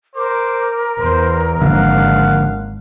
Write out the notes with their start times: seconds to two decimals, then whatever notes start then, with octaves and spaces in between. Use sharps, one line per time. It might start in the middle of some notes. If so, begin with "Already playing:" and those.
0.16 A#4 C5 D6
0.99 E2 C5
1.61 G#1 D3 F3 A#3 F5 F#5